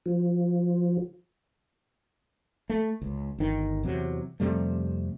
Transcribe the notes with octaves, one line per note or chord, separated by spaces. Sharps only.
F3
A3
C#2
G1 D#3
E2 C3 F#3
F2 C3 G3 A3